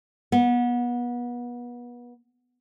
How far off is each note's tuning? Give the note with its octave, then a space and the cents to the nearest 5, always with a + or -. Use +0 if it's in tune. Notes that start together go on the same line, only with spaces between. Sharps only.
B3 -30